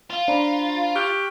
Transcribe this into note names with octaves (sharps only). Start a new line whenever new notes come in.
F4
D4 C5 A#5 B5
G4 C#6 F6 F#6